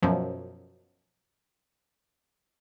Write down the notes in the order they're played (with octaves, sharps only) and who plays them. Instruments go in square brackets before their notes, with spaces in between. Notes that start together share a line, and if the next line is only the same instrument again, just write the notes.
[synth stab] F#2 B2 F3 F#3